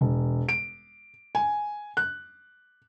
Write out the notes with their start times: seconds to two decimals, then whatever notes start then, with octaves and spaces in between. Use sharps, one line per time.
0.01 E1
0.49 D7
1.35 G#5
1.97 F#6